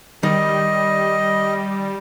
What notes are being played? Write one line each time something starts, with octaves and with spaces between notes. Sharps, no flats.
D#3 G3 D#5